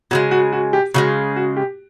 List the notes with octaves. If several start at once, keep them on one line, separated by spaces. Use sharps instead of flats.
C#3 F3 G#3 F#4
F#4
F#4
G4
C#3 F3 G#3 F#4
F#4
G4